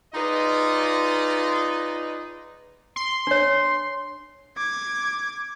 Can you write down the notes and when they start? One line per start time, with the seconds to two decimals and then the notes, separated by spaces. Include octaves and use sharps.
0.14 D#4 F4 G#4 B4 D5 D#5
2.96 C6
3.27 D4 C#5
4.57 D6 G#6